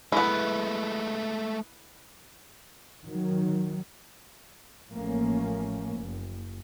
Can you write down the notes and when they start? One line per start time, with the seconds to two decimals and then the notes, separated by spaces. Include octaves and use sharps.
0.12 G#3 A3 B3 E4
3.05 D#3 F#3
4.92 A1 F3 A3 A#3 C#4
5.95 F#1